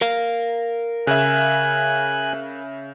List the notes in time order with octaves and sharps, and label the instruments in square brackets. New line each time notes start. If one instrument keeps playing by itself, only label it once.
[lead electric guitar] A#4 F5
[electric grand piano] C#3 E5 [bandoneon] G#5 F#6